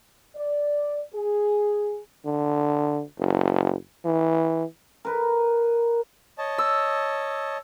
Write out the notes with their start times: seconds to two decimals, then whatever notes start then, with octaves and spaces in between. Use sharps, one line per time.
0.35 D5
1.13 G#4
2.26 D3
3.18 F#1
4.05 E3
5.05 A#4 B4
6.38 C#5 D#5 A5
6.58 E6